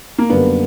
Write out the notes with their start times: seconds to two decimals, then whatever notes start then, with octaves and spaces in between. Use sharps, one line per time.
0.18 A#3
0.30 F#2 D3 G3 A#3 B3